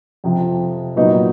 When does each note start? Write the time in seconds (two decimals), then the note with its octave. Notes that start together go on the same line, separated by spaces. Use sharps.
0.24 F2 C3 F3
0.96 A#2 F#3 B3 D#4